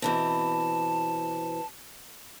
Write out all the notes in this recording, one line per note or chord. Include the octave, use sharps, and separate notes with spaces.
B2 E3 C4 A5